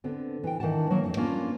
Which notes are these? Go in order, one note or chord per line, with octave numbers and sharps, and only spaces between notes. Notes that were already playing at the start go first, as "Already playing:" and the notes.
D3 B3 C4
E3 G5
D#3 E3 D4 F#5 A5
F#3 A#3
F2 A5
A#3 B3 C#4 D4 F4